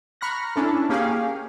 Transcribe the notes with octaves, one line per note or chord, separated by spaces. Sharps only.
A#5 B5 C#6 F6 F#6 A#6
C#4 D4 E4 A4
A#3 C#4 G4 G#4 F5